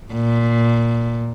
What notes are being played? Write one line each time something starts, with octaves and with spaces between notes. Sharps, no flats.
A#2